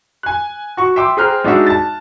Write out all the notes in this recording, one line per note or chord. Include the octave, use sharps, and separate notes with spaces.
G#5 F#6
F#4 C#6
E5 G5 C6 D6
G#4 C5 G5 A#5 F6 F#6
G#3 D4 D#4 F#4 E5
A5 A6